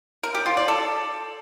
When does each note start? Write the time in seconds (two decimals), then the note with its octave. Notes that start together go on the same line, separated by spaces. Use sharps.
0.23 A#4
0.35 G4
0.46 F4
0.57 D5
0.68 A4